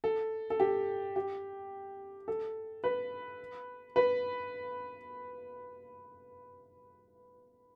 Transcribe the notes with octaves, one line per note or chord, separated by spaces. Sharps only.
A4
A4
G4
G4
A4
B4
B4